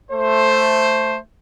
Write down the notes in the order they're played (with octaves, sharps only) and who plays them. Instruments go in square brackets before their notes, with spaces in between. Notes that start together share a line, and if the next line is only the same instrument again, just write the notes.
[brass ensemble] A3 C5